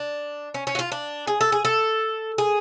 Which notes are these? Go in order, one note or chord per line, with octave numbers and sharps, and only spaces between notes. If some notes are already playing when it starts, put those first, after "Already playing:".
Already playing: D4
C#4
C#4
F#4
F4
D4
G#4
A4
G#4
A4
G#4